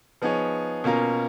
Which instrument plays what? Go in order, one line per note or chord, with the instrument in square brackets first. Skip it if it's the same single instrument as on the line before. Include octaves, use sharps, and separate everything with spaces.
[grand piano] F3 B3 D#4 G#4 C#5
B2 A#3 C#4 F4 A#4